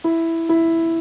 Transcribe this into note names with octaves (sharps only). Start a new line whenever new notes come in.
E4
E4